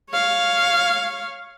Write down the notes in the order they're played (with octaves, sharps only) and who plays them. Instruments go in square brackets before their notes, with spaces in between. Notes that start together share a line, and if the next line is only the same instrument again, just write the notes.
[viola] C#5 F5